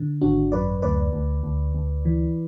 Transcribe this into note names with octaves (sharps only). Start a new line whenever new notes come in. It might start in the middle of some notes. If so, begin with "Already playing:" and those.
Already playing: D3
G#1 D4 F#4
F#2 B4 D5
D2 B4 D5
D2
D2
D2
E3